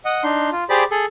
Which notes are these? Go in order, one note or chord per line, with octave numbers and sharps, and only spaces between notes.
D#5 F#5
D4 D#4 C6
F4
G4 G#4 C5 D5 B5
G#4 A4